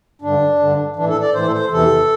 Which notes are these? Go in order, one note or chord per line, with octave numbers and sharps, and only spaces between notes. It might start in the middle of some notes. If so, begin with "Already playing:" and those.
G2 D3 D4
G2 D3
A2 E3 D4
A4
D5
A2 E3 C5
A4
C5
E2 C3 E3 A4